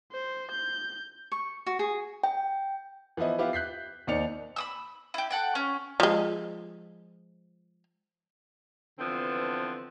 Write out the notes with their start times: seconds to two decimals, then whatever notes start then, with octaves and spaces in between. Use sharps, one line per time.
0.12 C5
0.51 G6
1.32 C#6
1.66 F#4
1.79 G#4
2.24 G5
3.17 E3 F3 B3 E4 D#5
3.38 B3 E4 F4 G4 B4
3.53 F#6 G6 B6 C7
4.07 D#2 D#4 C5 D5 C#7 F7
4.56 B5 D#6 E6
5.14 E4 G4
5.31 A4 F#5 G5
5.55 C#4
6.00 F3 G#3
8.99 D3 E3 F3 B3 C4